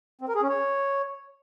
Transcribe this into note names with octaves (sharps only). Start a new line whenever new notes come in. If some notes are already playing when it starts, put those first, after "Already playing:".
C4
A#4
G#4
C#4
C#5